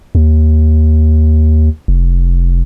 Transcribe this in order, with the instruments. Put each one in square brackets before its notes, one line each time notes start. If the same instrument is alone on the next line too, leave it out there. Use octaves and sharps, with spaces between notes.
[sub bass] D#2
F1